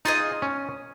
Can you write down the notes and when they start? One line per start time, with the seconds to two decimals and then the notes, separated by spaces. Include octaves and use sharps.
0.05 D#4 F4 G#4 D#5
0.42 C#4